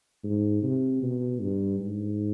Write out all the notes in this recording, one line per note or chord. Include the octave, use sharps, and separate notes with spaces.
G#2
C3
B2
G2
G#2